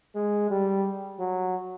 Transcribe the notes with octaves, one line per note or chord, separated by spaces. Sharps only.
G#3
G3
F#3